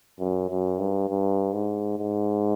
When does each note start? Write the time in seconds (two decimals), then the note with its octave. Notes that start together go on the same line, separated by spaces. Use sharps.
0.19 F#2
0.49 F#2
0.79 G2
1.09 G2
1.53 G#2
1.98 G#2